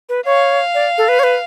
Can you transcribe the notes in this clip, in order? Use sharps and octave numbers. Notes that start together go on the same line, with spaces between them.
B4
C#5 F5
D5
A4
B4
C#5
B4